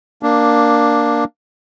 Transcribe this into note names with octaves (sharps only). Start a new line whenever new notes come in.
A#3 D4